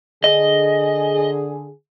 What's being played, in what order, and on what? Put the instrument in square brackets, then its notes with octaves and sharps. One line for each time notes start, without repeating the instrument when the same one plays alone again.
[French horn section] D3 G#4 [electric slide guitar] D#5